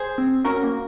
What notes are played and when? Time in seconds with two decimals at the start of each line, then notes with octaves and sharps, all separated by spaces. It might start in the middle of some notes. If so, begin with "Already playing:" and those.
Already playing: G#4 C5
0.18 C4
0.45 C#4 F#4 A#4
0.63 A#3